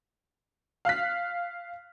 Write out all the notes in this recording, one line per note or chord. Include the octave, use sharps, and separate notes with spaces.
F5 F6 F#6 B6